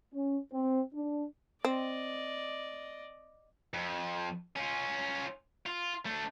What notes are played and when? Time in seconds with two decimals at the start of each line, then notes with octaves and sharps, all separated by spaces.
0.14 C#4
0.52 C4
0.93 D4
1.65 C4 D5 D#5
3.74 F2
4.56 C#4 F4
5.66 F4
6.06 A3 D4